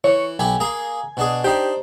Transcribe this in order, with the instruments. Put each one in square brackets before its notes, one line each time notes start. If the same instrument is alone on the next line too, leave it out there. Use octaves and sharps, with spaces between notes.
[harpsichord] E3 [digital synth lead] C#5
[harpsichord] B1 G4 B5 [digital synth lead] G#5
[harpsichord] A#3 G#4 A#5
B2 D4 G#4
[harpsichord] D4 D#4 C5 [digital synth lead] G4